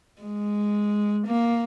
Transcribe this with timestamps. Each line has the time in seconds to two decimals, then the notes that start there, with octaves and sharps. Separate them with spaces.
0.22 G#3
1.27 A#3